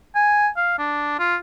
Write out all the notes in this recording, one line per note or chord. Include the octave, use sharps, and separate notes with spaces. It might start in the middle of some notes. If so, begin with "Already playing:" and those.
G#5
F5
D4
F4